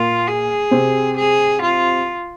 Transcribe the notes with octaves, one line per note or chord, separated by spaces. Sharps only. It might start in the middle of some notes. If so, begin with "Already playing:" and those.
Already playing: A#2 A#3 F4
G#4
C3 C4
G#4
F4